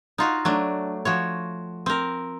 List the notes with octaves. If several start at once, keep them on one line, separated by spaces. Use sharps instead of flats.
D#4 F4 F#4
F#3 A3 D4
F3 F#4 C#5
C4 A#4